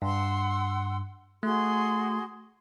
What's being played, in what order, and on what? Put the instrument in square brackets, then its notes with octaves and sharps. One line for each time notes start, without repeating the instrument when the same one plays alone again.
[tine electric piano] G2 [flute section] F#5 C6 E6
[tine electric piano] A3 [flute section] F#4 G#4 C6